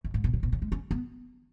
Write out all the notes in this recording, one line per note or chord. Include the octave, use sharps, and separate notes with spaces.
F#2
G#2
B2
C#3
B2
C#3
G#3
C#4
B3